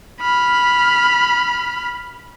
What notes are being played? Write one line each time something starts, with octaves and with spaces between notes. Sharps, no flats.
B5 F6